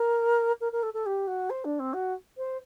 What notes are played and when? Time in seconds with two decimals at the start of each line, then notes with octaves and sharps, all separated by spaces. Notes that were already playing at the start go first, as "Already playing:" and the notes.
Already playing: A#4
0.61 A#4
0.72 A#4
0.83 A4
0.94 A4
1.06 G4
1.27 F#4
1.50 C5
1.64 D4
1.79 C4
1.93 F#4
2.37 C5